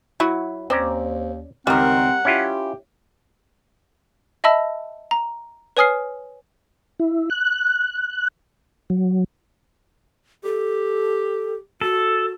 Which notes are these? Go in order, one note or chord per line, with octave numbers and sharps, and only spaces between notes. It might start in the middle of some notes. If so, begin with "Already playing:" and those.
F#3 E4 F#4
D#2 C4 C#4 D5 A#5
C#2 D#3 G3 C4 A#4 F#5
C#4 E4 F4 G4
D#5 E5 A5 B5 E6 A#6
A#5
B4 C#5 G#5 D#6 F6 C7
E4
F#6
F#3
G4 A4
F#4 A4